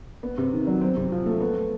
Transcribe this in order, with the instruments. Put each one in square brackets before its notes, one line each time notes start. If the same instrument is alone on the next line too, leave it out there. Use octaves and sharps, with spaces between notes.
[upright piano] B3
C3
D#3
F#3
C4
C3
F3
A3
B3